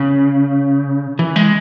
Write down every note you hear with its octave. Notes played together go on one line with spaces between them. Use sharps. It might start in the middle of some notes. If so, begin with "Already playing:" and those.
Already playing: C#3
E3
G#3